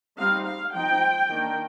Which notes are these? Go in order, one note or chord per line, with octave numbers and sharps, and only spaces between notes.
G3 C4 D#4 F5
F5
F3 C4 D#4 G5
D#3 A#3 D4